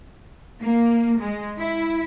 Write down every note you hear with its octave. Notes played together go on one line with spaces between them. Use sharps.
A#3
G#3
E4